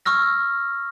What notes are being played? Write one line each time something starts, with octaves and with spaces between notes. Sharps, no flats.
C#6 E6 F6 A#6